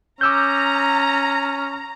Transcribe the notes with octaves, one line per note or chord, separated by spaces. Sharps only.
C#4 A#5 D6 E6 G6